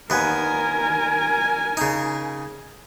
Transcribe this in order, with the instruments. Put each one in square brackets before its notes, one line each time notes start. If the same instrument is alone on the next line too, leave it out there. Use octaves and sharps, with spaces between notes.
[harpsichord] D#2 B3 [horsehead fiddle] A#4 G#5
[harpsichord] C#3 D#4